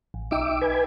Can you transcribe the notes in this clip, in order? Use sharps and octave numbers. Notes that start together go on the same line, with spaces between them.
A1
B1 D#4 E5 G5 D6
B4 G#5